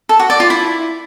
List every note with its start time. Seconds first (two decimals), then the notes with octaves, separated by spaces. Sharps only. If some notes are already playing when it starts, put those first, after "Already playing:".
0.09 A4
0.19 F#4
0.30 D5
0.40 F4
0.50 E4